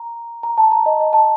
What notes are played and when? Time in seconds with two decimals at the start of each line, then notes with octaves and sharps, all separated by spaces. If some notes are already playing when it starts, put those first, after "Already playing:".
Already playing: A#5
0.43 A#5
0.58 A5
0.72 A#5
0.86 D#5
1.00 D#5
1.13 A5